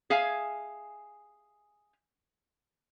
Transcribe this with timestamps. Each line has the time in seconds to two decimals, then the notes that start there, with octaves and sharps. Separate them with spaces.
0.10 G#4 E5 F5 G#5